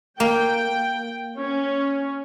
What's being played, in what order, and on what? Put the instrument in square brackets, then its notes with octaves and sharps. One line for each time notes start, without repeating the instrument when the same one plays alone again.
[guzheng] A#3 [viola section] G5
[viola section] C#4